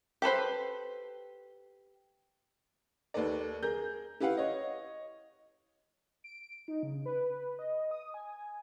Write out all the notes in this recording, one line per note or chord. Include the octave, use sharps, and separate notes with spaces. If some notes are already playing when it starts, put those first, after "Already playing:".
G4 A4 B4 C5
D#2 D#3 A4 B4 D5
G#4 A#4 G6
E4 G4 B4 F5 F#5
C#5 D#5
D7
D#4
C#3
B4
B4
D#5
D#6
G#5